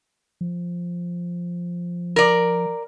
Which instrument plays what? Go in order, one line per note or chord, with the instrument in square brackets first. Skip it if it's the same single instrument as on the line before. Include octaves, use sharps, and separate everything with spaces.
[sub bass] F3
[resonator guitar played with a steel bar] A#4 D5